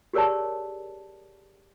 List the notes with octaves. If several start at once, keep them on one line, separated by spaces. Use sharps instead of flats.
G4 G#4 A#4 C#5 D5 A5